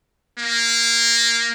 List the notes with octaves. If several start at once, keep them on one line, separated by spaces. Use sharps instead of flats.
A#3